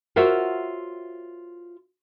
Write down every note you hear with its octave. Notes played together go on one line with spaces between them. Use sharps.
F4 F#4 A#4 C5 C#5 E5